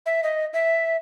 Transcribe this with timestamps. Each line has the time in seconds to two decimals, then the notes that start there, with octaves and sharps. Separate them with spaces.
0.06 E5
0.24 D#5
0.54 E5